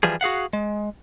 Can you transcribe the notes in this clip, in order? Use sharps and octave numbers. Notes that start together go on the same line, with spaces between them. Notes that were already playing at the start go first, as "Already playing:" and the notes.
E3 F3 G3 G#4
F#4 G#4 F5 F#5
G#3